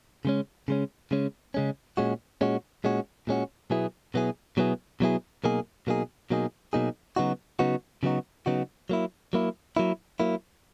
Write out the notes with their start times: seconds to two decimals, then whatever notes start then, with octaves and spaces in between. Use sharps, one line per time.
0.25 C#3 G#3 C#4
0.68 C#3 G#3 C#4
1.11 C#3 G#3 C#4
1.54 C#3 G#3 C#4
1.97 A#2 G#3 C#4 F#4
2.41 A#2 G#3 C#4 F#4
2.84 A#2 G#3 C#4 F#4
3.27 A#2 G#3 C#4 F#4
3.70 B2 F#3 B3 E4 G#4
4.14 B2 F#3 B3 E4 G#4
4.57 B2 F#3 B3 E4 G#4
5.00 B2 F#3 B3 E4 G#4
5.44 B2 F#3 A#3 D#4 G#4
5.87 B2 F#3 A#3 D#4 G#4
6.30 B2 F#3 A#3 D#4 G#4
6.73 B2 F#3 A#3 D#4 G#4
7.16 C#3 F#3 B3 D#4 F#4
7.59 C#3 F#3 B3 D#4 F#4
8.03 C#3 F#3 B3 D#4 F#4
8.46 C#3 F#3 B3 D#4 F#4
8.90 F#3 A#3 E4
9.33 F#3 A#3 E4
9.77 F#3 A#3 E4
10.20 F#3 A#3 E4